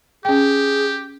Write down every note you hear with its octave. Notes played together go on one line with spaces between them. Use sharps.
C#4 G4 G#4 G5